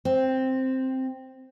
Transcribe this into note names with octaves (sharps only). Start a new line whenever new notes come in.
C4